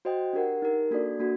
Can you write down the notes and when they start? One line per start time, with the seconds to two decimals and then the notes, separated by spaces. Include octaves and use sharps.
0.05 F#4 C5 D#5 G5
0.33 D4 G4 A#4 F#5
0.62 D#4 G4 A#4
0.91 A#3 D4 F#4 A4 D5
1.19 A#3 D4 F#4